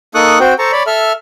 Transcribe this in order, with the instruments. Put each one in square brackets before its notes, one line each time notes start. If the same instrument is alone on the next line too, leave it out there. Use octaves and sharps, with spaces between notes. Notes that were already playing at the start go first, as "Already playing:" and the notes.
[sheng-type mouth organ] A#3 D#4 A4 C#6 D#6 F#6
C4 F#4 C5 G5
A4 C5 A5 A#5 C#6
C#5 D5 B5
A4 E5 F6